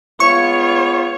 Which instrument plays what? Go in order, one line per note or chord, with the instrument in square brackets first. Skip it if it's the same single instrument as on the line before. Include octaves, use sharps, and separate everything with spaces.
[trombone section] G#3 B3 F4 [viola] C#5 [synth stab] C#6